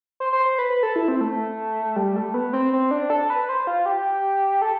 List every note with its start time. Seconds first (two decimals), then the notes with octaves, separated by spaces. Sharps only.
0.20 C5
0.33 C5
0.45 C5
0.58 B4
0.70 B4
0.83 A4
0.96 E4
1.08 C4
1.21 A3
1.96 G3
2.16 A3
2.34 B3
2.53 C4
2.73 C4
2.91 D4
3.10 A4
3.30 B4
3.49 C5
3.67 F4
3.86 G4
4.62 A4